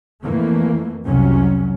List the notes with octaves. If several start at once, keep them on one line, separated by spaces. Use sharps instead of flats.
F2 E3 A3 A#3
C2 F2 C3 F#3 C#4